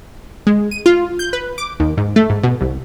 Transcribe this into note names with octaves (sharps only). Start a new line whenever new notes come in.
G#3
D#7
F4
G6
B4
D6
D#2
G#2
A3
G#2
B2
C2